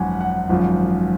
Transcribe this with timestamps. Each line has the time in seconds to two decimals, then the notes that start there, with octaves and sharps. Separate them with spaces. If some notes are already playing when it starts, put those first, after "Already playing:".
Already playing: G#1 F#2 F3 F#5 G#5
0.21 F#5
0.49 G#1 F#2 F3